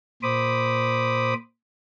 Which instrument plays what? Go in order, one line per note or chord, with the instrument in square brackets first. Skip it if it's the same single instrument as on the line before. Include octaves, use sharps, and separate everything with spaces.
[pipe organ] A#2 C5 B5 D6 D#6